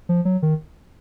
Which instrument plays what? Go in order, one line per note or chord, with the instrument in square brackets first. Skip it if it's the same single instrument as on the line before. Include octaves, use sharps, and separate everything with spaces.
[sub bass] F3
F#3
D#3